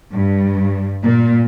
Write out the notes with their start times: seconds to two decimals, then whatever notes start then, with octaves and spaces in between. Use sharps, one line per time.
0.13 G2
1.03 A#2